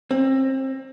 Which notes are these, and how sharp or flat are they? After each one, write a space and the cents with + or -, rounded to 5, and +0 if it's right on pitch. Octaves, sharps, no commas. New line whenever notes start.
C4 +30